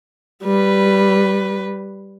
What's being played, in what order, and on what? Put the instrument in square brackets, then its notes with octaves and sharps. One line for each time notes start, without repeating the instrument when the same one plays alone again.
[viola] G3 B4